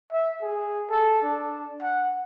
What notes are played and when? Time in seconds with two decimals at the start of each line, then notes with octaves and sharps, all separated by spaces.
0.12 E5
0.42 G#4
0.90 A4
1.23 D4
1.82 F#5